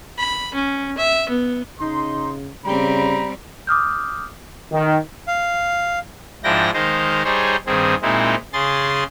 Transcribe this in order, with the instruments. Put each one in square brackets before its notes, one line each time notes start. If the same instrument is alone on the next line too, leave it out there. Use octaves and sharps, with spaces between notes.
[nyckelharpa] B5
C#4
E5
B3
[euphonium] C#3 [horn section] D#4 C6
[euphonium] C#3 [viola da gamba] G3 C4 [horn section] G4 A#5 B5
[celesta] D6 D#6 F6 G6
[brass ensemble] D#3
[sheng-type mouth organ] F5
[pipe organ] G#2 F3 D4 E4 G5 A#6
D#3 G#3 C5 D#5 F5
G3 D#4 G#4 C5 C#5
G2 D#3 C4 G#4
A#2 G#3 C4 D#4 E4
C#3 G#4 C6 A6